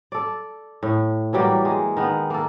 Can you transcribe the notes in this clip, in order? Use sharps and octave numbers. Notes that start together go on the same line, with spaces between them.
A4 D5
A2
E3 F#3 G3 A#3
G#3
D#3 B3
A#3 A4